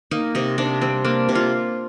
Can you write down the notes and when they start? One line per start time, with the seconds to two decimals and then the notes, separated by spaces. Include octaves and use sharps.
0.11 A#3 D#4
0.35 C3 D#4
0.58 C3 D4
0.81 G3 C4
1.05 A#3 D4
1.29 C3
1.35 F4